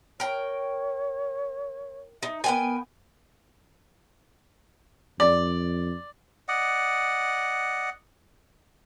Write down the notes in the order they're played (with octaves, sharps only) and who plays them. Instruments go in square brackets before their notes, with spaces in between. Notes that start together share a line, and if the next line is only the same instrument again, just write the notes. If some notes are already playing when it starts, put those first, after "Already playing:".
[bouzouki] A#4 G5 [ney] C#5
[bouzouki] D#4 [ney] E5
[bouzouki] B3 G5 G#5 [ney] A#4
[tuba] F2 [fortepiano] D5
[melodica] D5 D#5 F#5